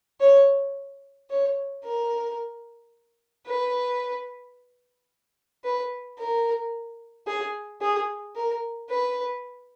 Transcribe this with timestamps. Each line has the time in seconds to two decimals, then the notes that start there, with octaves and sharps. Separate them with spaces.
0.21 C#5
1.30 C#5
1.84 A#4
3.46 B4
5.64 B4
6.19 A#4
7.27 G#4
7.81 G#4
8.36 A#4
8.90 B4